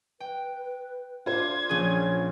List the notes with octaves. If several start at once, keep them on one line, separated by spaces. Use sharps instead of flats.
B4 G5
D4 F4 C5 G#6
A#1 C#4 G#4